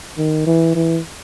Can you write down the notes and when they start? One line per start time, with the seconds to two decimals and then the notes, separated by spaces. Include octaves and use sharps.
0.18 D#3
0.46 E3
0.75 E3